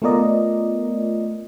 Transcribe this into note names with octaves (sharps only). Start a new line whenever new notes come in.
A3 B3 F4 A#4 D5 D#5